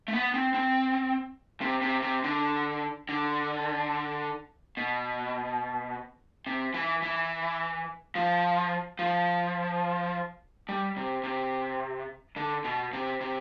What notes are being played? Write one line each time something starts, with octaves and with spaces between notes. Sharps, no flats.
A3
B3
C4
C4
C3
C3
C3
D3
D3
B2
C3
E3
E3
F3
F3
G3
C3
C3
D3
B2
C3
C3